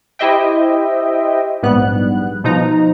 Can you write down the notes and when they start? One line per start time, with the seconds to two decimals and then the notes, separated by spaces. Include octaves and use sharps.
0.19 E4 G4 C5 D#5 E5 G5
1.63 A#1 G#2 G3 B3 F#6
2.44 B2 F3 D#4 A#5